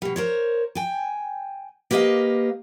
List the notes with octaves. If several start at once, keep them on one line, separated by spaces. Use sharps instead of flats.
B2 G3
A#4 C5 C#5
G5 G#5
A#3 G4 B4 C5 D#5 F5